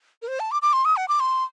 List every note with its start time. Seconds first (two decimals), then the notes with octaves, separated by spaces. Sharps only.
0.22 A#4
0.28 C5
0.40 A5
0.51 D6
0.62 D6
0.73 C6
0.85 D#6
0.97 F#5
1.08 D6
1.20 C6